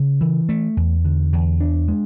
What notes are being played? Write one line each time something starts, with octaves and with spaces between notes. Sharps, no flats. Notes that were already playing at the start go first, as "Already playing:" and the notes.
Already playing: C#3
E3
A3
E2
D3
E2
D4
G#3